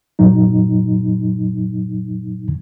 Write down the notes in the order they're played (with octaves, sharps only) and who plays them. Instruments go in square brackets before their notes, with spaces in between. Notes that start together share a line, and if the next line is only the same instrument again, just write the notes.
[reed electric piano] F#2 A#2 F#3 D#4